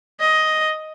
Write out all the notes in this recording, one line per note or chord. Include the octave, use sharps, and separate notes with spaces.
D#5